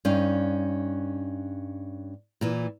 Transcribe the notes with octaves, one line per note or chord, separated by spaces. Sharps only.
G2 C#4 D#4 F5
A#2 E3